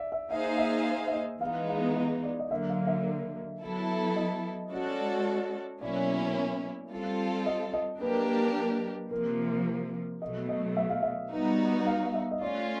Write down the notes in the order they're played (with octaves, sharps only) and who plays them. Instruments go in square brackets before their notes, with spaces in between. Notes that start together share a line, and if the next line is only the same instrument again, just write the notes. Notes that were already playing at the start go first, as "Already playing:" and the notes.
Already playing: [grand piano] D5 E5
E5
[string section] A#3 D#4 G#4 C5 F5 [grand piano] E5
[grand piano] E5
E5
D#5
[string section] E3 G#3 B3 D#4 [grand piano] F5
[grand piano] F5
D#5
D5
D#5
[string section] D3 F#3 A#3 [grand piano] E5
[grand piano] F5
E5
[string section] F#3 B3 E4 A4
[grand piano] D#5
[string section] G#3 C#4 F#4 A4 D5
[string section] B2 F#3 A#3 C#4 E4 [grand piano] D5
[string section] G3 C4 F4 A4
[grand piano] D#5
D#5
[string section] F#3 A#3 D4 G4 A#4 [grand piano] B4
[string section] C3 F3 A#3 [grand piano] A#4
[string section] B2 F#3 A3 [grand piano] D#5
[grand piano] D#5
E5
F5
E5
[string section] G3 B3 D#4 F#4
[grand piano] F5
F5
E5
D#5
[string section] A3 C#4 F4 [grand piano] D5